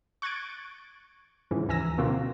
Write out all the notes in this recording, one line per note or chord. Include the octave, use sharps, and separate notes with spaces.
C#6 F#6 G#6 A6 D7
G#2 C#3 E3 F3
D2 E3 G#5 A#5 E6 A#6
B2 D3 A#3 C4 F4 F#4